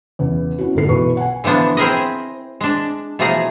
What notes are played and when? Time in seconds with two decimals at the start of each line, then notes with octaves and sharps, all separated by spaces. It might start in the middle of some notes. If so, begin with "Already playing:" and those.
0.19 E2 C#3
0.58 C#4 E4 F#4
0.75 G1 G#2 F#4 A4 C7
0.88 B1 E3 B4 C#6
1.17 F#5 G#5
1.44 D3 E3 F3 B3 D4
1.77 C4 E4 G#4 A#4 B4 D#5
2.61 G#3 D4
3.19 B2 E3 F3 A3 G#4 A#5